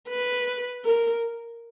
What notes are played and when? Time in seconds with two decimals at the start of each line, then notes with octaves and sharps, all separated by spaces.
0.09 B4
0.85 A#4